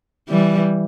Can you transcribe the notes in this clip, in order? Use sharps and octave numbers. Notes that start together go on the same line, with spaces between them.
E3 G3